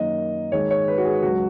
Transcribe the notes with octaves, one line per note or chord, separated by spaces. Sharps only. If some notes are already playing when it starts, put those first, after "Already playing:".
Already playing: F#2 D#3 A#3 D#5
G#1 G#2 D#3 G#3 C#5
C#5
B4
F#4
G#4
C#2 C#3 F#3 F#4